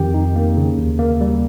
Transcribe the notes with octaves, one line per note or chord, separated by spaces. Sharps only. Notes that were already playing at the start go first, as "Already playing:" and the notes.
Already playing: F2 D#3 G4 G5
D#4
A#3
C#3
D#2
A#3
G3